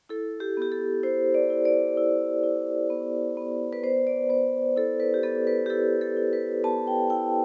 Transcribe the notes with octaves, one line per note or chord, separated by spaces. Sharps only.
E4 A4
G4
B3 G4
A4
E4 C5
D5
E4
D5
E4
E4
B3
B3
B4
B3 C5
D5
B3 C5
E4 A4
B4
G4
B3 A4
B4
G4
E4 A4
A4
E4
B4
B3 A5
G5
E4 G5